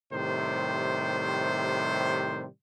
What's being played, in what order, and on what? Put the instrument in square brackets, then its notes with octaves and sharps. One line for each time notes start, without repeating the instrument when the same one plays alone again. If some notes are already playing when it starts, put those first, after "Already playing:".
[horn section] A2 C3 D#3 G3 C5